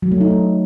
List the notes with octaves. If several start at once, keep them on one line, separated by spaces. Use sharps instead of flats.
F#3
A3
D#4